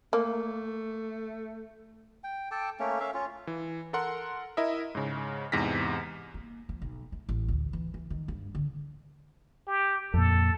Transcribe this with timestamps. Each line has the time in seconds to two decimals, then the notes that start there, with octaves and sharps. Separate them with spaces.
0.13 A3 A#3
2.24 G5
2.51 A4 G5 A5 D6
2.80 A3 A#3 C#4
3.00 C#4 E5 F5
3.14 C#4 F4
3.47 E3
3.93 A4 A#4 F#5 C6
4.57 E4 A#4 D#5 E5
4.95 G#2 C#3
5.52 E2 G#2 C3 F6 A#6 B6
6.34 A#3
6.69 F3
6.82 B1
7.12 A3
7.29 A1
7.48 D2
7.73 E3
7.94 E3
8.10 D#3
8.28 G2
8.55 D3
9.67 G4
10.14 F2 A#2 A4